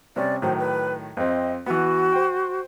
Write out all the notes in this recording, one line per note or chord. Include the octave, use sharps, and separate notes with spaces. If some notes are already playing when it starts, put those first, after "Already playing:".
C3 G3 C#4 D5
A2 D#3 F#3 C5
B4
F2 C4 D#5
E3 B3 F#4
C5 G5